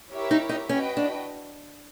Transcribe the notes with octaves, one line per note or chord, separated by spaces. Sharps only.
E4 G4 A#4 C#5 E5
D#4
D#4
C#4 F#4 B4 D#5 G5
D4